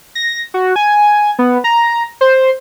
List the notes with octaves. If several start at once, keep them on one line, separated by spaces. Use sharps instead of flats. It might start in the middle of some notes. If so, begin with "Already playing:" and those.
A#6
F#4
G#5
B3
A#5
C5